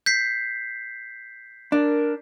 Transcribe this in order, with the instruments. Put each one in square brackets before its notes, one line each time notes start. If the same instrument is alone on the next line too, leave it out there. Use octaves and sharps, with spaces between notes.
[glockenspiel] G6 B6 C7
[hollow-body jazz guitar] D4 [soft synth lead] A#4